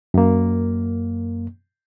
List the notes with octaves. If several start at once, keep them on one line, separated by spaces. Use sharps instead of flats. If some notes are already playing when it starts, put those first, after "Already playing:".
F#2 A#3